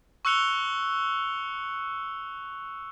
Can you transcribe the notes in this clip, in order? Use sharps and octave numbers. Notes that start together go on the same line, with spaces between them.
C#6 E6 F#6 C#7 F7 G7